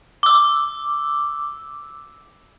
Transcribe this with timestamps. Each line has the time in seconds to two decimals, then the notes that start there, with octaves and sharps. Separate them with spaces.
0.23 D6 E6